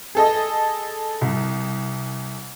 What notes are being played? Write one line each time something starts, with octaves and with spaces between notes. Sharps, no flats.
G#4 A4 D#5
C2